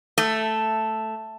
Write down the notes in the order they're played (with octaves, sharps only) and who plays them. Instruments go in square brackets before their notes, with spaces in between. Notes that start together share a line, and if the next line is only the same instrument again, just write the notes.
[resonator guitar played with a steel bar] A3